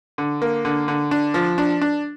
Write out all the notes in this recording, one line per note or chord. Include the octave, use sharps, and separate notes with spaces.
D3
A#3
D3
D3
D4
F3
D4
D4